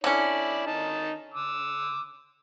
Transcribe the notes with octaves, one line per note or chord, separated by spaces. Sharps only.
D3 C#4 E4 D5
D#3 D#4 A5
D6 E6